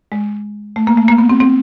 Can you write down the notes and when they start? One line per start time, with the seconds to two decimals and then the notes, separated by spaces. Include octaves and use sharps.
0.12 G#3
0.76 A3
0.87 A#3
0.97 A3
1.08 A#3
1.18 B3
1.30 C4
1.40 C4